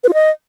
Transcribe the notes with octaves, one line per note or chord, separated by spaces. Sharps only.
B4
F4
D#5